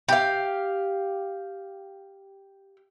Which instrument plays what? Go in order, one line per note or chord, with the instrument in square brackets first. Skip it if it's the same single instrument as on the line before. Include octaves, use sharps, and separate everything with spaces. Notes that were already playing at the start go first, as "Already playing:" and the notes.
[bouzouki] G4 F5